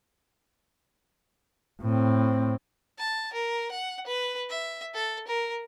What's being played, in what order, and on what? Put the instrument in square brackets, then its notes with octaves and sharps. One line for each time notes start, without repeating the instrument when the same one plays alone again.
[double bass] A2 C4
[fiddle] A5
A#4
F#5
B4
E5
A4
A#4